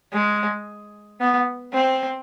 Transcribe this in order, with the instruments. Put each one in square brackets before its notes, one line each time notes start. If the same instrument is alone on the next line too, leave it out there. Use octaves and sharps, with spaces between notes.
[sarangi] G#3
B3
C4